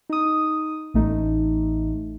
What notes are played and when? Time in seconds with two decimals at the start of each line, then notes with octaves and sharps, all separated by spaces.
0.10 D#4 D#6
0.94 A1 A3 D#4